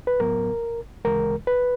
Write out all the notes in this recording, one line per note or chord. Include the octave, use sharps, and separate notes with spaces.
B4
A2 F#3 B3 A#4
D2 C#3 E3 G#3 A#4
B4